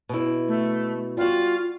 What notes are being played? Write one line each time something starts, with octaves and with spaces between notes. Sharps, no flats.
B2 E4
A3
G3 F4 F#4